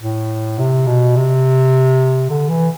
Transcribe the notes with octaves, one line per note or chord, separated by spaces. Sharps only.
A2
C3
B2
C3
D3
E3